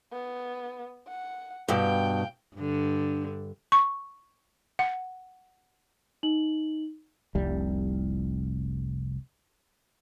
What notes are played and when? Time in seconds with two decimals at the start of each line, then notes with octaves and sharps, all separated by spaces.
0.13 B3
1.08 F#5
1.68 G2 B2 F5 G5
2.56 G2 D3
3.72 C#6
4.79 F#5
6.23 D#4 F#7
7.35 F1 C2 G3